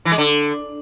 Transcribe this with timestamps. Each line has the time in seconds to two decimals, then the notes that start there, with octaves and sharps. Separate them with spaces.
0.05 E3
0.12 G#3
0.18 D3